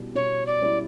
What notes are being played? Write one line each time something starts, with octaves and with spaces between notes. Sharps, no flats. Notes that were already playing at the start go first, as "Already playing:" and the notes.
Already playing: B2 G3 C#4 E4
B2 C#5
D5
G3 C#4 E4